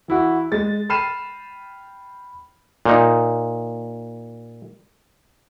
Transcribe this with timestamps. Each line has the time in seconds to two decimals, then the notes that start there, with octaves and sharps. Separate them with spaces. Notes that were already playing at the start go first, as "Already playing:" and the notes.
0.08 E3 E4 F#4
0.52 G#3 A6
0.89 G5 B5 F6 C7 D#7 E7
2.85 A#2 D#4